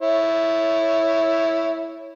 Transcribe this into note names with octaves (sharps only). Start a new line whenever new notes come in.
E4 C#5